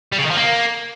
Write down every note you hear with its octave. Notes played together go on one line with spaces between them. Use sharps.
G3
C#3
D#3
F3
A#3